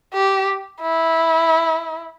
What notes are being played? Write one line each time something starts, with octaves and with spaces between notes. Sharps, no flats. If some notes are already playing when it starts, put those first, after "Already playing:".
G4
E4